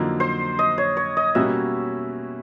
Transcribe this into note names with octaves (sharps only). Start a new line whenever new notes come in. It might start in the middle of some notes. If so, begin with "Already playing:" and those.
Already playing: F2 D3 F#3 A#3 D#4
C5
D#5
C#5
C#5
D#5
B2 G3 A#3 C#4 F#4 E5